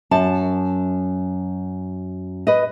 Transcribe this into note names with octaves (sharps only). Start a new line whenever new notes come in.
F#2 A5
B4 D#5